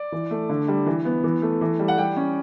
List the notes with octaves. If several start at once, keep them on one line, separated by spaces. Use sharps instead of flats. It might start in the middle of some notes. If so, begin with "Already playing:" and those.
Already playing: D5
E3
A3
D3
G3
E3
B3
E3
A3
E3
G3
F#5
G3 G5
C#4